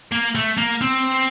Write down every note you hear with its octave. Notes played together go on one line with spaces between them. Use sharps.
A#3
A3
A#3
C4